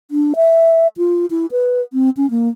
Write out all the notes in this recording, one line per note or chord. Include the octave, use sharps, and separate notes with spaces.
D4
E5
F4
E4
B4
C4
C#4
A#3